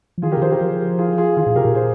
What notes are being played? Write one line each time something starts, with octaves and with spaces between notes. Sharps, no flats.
F3
D#3 F4 G#4
G4 A#4
C#3
D#3 G#4 C5
G4 A#4
F3
F4 G#4
F4 G#4
D#3 F4 G#4
A#2
C3 G4 A#4
A#2
G#4 C5